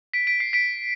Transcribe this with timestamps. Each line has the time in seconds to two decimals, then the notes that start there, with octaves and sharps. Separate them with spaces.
0.14 B6 D7
0.27 B6 D7
0.40 C7
0.53 B6 D7